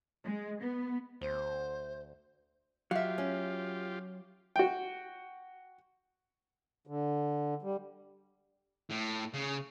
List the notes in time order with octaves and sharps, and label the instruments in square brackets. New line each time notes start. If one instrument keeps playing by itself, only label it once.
[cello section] G#3
B3
[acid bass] D2 [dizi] C5
[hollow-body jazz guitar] F#3 [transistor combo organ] F4 G4 [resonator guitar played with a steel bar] E5 F5
[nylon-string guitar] C#4
[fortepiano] F#4 G5
[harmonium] D3
G3
[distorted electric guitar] A2
C#3